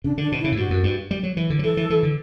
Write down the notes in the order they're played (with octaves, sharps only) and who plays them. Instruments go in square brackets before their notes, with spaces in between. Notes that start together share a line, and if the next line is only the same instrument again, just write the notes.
[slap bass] C#3 [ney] D4
[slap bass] D3 [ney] D4
[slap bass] B2
[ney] E4
[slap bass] C#3
A2
[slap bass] G2 [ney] F#4
[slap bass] F#2
G2
G3
F#3
E3
D3
F#3
[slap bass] E3 [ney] A4
[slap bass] E3
E3
D3